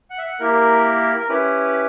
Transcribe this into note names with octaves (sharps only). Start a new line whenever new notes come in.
F#5
E5
F#5
A#3 E4 G4 A#4
A#4
C#4 E4 G4 B4